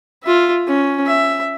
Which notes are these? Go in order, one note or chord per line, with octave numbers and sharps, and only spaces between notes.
F4 E5
C#4
E5